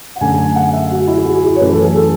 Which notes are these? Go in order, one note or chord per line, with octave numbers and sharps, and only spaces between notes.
F#5
F#2 D3 A3 G#5
G#5
F#5
E5
F#4
E4
G#4
F#4
G#4
E4
C#5
F#2 E3 A3 B4
A4
G#4
A4